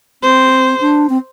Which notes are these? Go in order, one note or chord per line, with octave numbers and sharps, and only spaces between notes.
C4 C5
D4
C4